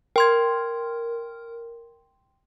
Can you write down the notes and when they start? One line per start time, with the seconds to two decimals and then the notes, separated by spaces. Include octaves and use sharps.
0.16 A#4 G5 C6 G#6